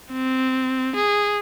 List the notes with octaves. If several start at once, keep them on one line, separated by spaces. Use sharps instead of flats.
C4
G#4